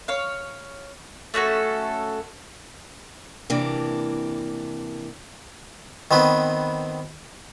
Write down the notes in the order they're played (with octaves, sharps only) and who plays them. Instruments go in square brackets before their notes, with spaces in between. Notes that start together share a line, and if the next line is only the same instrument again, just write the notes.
[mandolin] C#5 F5
A3 C#4 F#4 A4
[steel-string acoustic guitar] C3 E3 A#3 D4
[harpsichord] D#3 B3 C4 B4